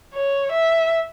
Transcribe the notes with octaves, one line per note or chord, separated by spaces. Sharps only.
C#5
E5